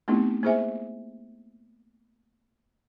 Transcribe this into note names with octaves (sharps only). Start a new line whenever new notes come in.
A3 B3 C4 D#4 E4 G4
A#3 E4 G#4 C5 E5 G#5